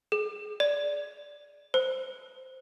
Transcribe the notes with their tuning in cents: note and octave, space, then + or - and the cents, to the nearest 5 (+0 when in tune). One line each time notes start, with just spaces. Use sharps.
G#4 +25
D5 -10
C5 -10